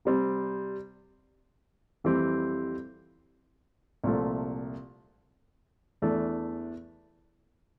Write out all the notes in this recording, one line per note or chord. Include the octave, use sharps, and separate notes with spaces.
C3 G3 C4
F2 E3 G3 C4 G4
C2 A#2 F3 A3
E2 E3 A3 D4